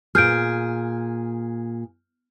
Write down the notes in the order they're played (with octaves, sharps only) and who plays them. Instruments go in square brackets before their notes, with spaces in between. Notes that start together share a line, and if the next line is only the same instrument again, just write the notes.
[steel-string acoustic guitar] A#2 G#4 [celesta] F6 G6 D7